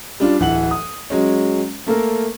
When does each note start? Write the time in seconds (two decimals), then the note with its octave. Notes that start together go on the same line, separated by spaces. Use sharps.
0.20 G3 D4 F4
0.40 D1 E3 F#5 F#7
0.71 D#6
1.10 F#3 G#3 C#4
1.87 A3 A#3 A4 A#4